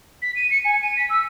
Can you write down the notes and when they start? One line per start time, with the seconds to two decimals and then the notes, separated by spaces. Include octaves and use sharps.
0.22 B6
0.36 D#7
0.51 C#7
0.65 G#5
0.82 D#7
0.97 B6
1.10 E6